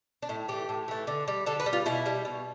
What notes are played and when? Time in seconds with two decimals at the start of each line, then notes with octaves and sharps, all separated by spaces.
0.22 D4
0.29 A2 E4
0.48 E3 A3 G4
0.69 A2
0.88 E3 A3
1.07 D3
1.28 G3
1.46 D3 A4
1.60 B4
1.66 G3
1.73 F4
1.86 B2 E4
2.06 G3
2.25 B2